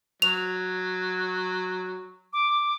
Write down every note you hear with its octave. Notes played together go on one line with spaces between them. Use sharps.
F#3 F7
D6